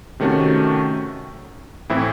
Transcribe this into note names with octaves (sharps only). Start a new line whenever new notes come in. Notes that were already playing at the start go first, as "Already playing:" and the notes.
C3 D#3 A3 C#4 F#4
A2 E3 C4 E4